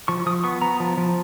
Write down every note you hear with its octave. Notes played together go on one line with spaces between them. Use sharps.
F3 C#6
F3 D#6
B3 C#6
B3 A#5
F3
F3